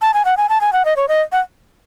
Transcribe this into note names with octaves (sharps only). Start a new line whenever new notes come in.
A5
G#5
F#5
G#5
A5
G#5
F#5
D#5
C#5
D#5
F#5